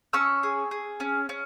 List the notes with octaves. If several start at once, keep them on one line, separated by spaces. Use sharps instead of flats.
C#4 C#6 E6
G#4
G#4
C#4
C#4